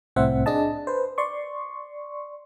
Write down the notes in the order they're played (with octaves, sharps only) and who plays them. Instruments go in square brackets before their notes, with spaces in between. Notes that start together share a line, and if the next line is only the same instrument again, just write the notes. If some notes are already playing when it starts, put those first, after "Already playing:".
[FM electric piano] C2 A2 C4 C5 E5 F#5
D4 G#4 D#5 A5
B4 C5
D5 C6 C#6